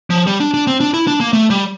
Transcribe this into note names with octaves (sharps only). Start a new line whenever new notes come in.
F3
G3
D4
D4
C4
D4
E4
D4
A#3
A3
G3